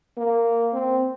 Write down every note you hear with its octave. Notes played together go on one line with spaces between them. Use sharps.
A#3
C4